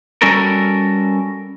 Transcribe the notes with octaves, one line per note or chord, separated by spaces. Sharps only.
G3 C#4 F#4 A4 A#4